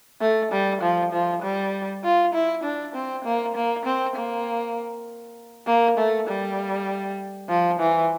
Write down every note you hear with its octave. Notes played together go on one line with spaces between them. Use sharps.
A3
G3
F3
F3
G3
F4
E4
D4
C4
A#3
A#3
C4
A#3
A#3
A3
G3
F3
E3